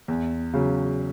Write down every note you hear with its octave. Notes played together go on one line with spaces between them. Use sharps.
E2
C#3 F#3